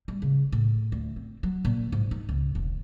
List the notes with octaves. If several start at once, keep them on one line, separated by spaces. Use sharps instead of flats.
G3
C#3
A2
D2
C4
F#3
A#2
G#2
D#4
C#2
E1